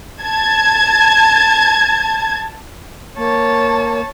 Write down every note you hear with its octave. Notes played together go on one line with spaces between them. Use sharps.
A5 G#6
A#3 C#5 A5